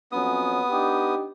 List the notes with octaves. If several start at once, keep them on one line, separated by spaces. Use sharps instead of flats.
F2 F#3 B3 C#4 D#6
D4 D#4 G4